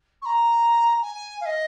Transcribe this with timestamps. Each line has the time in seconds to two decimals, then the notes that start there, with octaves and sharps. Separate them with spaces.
0.21 C#6
0.25 A#5
1.01 G#5
1.40 F5
1.45 D#5